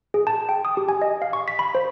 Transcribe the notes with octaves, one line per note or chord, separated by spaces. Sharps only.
G#4
A5
G5
D#6
G4
G#5
D#5
F5
C#6
B6
B5
C5